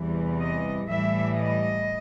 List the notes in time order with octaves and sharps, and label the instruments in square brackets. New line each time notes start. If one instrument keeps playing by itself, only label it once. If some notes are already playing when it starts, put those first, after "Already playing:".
Already playing: [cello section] E2 C3 E3 G3
D#5
A2 E3 G3 E5
D#5